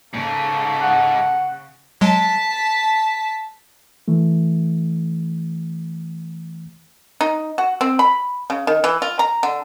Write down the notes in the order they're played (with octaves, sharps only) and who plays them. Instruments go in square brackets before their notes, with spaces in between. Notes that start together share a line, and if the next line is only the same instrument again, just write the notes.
[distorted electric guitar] G#2 [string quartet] C#3 [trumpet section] A#3 A4 C#6
[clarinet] F#5
[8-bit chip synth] F#3 G#3 [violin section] A5 B6
[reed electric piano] E3 A3
[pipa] D#4
F#4
C4
B5
C#3
D#3
E3
F4
A#5
D3